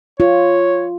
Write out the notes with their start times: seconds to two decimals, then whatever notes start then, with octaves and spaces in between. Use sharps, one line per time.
0.20 F4 C#5